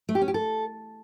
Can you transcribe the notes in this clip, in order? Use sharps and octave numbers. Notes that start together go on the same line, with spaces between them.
A3
G4
C#4
G4
A4